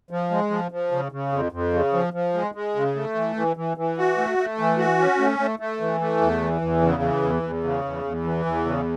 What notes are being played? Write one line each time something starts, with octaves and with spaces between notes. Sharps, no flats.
F3
G#3
F3
F3
C#3
C#3
F2
F2
C#3
F3
F3
G#3
G#3
C#3
A3
E3
E3
E3
E3
F#4
A3
A3
E3
F#4
C#4
A3
A3
A3
E3
A3
E2
E3
E2
C#3
E3
E2
E2
C#3
E2
E2
E3
E2
C#3